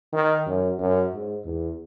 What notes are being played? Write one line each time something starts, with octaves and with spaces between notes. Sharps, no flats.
D#3
F#2
F#2
G#2
E2